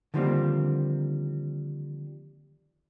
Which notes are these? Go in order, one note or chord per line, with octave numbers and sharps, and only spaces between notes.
D3 D#3 F3 G3 A#3 C4